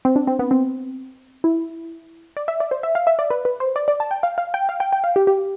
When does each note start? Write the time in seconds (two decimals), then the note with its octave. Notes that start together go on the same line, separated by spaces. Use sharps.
0.05 C4
0.16 D4
0.27 C4
0.39 B3
0.51 C4
1.44 E4
2.37 D5
2.48 E5
2.60 D5
2.71 C5
2.83 E5
2.95 F5
3.07 E5
3.19 D5
3.30 B4
3.45 B4
3.60 C5
3.76 D5
3.88 D5
4.00 A5
4.11 G5
4.23 F5
4.38 F5
4.54 G5
4.69 F5
4.80 G5
4.93 G5
5.04 F5
5.16 G4
5.27 G4